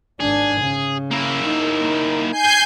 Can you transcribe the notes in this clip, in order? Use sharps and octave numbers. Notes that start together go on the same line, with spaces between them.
G#1 D4 G#4
C#3
A#3 E4
D#4
G#5 G6 C7